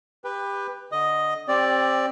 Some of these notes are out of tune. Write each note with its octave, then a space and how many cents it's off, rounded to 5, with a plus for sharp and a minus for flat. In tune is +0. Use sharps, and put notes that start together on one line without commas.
G4 +20 B4 +0 G5 +25
D3 +0 D#5 +0 D#6 +0
C4 +20 G4 +0 D5 +0